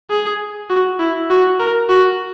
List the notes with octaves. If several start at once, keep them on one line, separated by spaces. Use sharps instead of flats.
G#4
F#4
E4
F#4
A#4
F#4